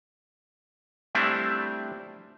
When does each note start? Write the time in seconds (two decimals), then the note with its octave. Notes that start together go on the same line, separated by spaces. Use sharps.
1.15 G3 A3 C4 D4 E4